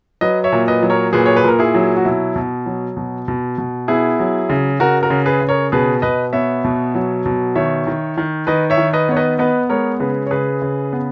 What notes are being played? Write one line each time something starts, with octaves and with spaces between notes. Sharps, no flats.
F#3 B4 D#5
C#5 E5
A#2
B4 D#5
F#3
A#4 C#5
A#2 G#4 B4
C#5
B4
A#2 A#4
E4 G#4
F#3
F#4
B2 E4
B2
F#3
B2
B2
B2
B3 E4 G#4
F#3
C#3
C#3 F#4 A#4
F#4 A#4
C#3
G#4 B4
C#3
A#4 C#5
B2 G#4 B4
B2 B4 D#5
B3 C#5 E5
B2
F#3
B2
D#3 C#5 E5
D#3
D#3
D#3 B4 D#5
C#5 E5
D#3
B4 D#5
B3 C#5
B4 D#5
B3 B4 D#5
G#3 A#4 C#5
C#3 G#4 B4
C#5
C#3 G#4 B4
C#3
B3